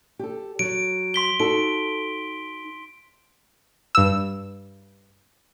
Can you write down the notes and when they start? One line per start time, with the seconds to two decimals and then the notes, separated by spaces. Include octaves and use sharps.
0.19 G4 A4
0.59 F#3 D7
1.14 C6 B6 G7
1.40 D#4 F#4 A4 D7
3.95 G2 E6